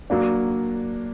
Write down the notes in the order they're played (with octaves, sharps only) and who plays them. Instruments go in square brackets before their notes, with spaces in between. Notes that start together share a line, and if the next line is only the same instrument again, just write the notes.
[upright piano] F#3 A#3 D4